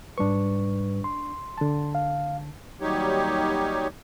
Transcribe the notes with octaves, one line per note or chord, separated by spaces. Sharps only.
G#2 G3 D4 B4 C#6
C6
D3 A5
F5
D#2 F#3 G3 D#4 G4 C#5